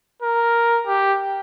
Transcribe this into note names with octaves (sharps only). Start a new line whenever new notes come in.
A#4
G4